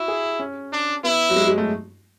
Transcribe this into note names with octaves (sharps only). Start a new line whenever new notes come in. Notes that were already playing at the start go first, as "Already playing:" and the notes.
Already playing: E4 F#4
G#4
C#4
D4
B3 E4
F#3
G#3
G#3
A3